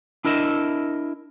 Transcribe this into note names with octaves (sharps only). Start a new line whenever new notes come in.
D4 E4 A#4 D#5 E5